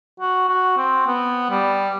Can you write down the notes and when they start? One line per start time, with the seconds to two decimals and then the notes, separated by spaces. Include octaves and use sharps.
0.20 F#4
0.49 F#4
0.78 C4
1.07 B3
1.51 G3